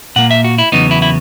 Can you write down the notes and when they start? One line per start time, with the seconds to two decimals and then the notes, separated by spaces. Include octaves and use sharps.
0.16 A#2 A#3 F#5
0.31 E5
0.44 F#4
0.58 E4
0.72 E2 C#3 F#3 B3 D#4
0.91 E4
1.02 E4